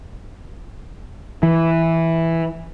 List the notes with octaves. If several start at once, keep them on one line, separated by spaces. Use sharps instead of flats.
E3